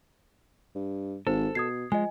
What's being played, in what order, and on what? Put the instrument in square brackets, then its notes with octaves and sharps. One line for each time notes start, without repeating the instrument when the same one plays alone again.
[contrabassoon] G2
[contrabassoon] G#1 [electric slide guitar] A4 [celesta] C5
[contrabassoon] B2 [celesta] D#6 G#6 C7
[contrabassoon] F3 [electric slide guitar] G#3 [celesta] D#5 G#5